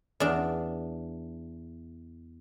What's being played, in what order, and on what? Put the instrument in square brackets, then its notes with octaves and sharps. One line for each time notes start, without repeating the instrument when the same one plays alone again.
[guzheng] E2 D4